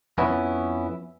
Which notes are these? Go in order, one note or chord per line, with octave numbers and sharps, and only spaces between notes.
F2 B3 C#4 E4